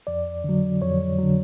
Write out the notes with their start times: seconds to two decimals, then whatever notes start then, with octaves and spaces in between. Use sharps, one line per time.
0.07 F2 D5
0.44 D3 F#3
0.82 F2 C#5
1.18 D3 F#3